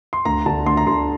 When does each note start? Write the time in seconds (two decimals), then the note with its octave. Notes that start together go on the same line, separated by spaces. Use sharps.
0.13 C6
0.25 D2 A#5
0.46 D3 A5
0.66 D2 C6
0.77 A#5
0.87 D3 C6